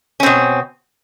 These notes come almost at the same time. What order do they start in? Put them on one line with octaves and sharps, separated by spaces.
C#4 C4 B2